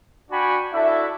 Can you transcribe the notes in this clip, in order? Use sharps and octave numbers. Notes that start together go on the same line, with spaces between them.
D4 F#4 D5 G5 G#5 B5
D4 E4 F#4 A4 E5